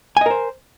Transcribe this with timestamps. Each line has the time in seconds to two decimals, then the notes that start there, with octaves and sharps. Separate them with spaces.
0.17 G#5
0.21 D#5
0.26 A#4
0.31 C5